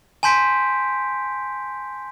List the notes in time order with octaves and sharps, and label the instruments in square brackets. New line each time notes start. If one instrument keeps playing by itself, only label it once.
[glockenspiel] G#5 A5 C6 G6 B6 D7